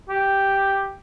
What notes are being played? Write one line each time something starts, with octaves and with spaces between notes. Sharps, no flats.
G4